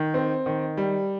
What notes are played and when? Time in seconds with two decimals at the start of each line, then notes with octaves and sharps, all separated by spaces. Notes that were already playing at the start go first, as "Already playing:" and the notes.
Already playing: D#3
0.14 C4
0.46 D#3
0.77 G3